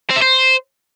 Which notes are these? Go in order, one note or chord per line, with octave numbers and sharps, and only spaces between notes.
C4
E5
C5